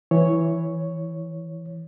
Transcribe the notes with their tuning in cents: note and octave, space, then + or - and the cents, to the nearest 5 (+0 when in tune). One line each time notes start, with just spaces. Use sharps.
E3 +0 C#5 +0